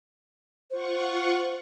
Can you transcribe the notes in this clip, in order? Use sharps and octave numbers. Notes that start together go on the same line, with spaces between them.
F4 C5 F#5 C#6